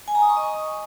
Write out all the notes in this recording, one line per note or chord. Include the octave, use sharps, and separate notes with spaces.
G#5
A#5
D#6
C#6
D#5